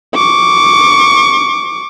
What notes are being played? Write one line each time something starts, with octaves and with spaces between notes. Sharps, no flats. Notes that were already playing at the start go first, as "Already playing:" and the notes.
C#6 D6